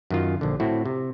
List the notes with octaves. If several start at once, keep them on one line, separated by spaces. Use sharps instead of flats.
F#2 D#3 F4
A#1 D3
A2 C4 E4 F#4
C3